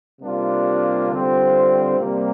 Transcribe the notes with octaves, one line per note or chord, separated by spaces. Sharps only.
C3 G3 A#3 D4 F4
D3 G3 C4 F4
C3 G3 A#3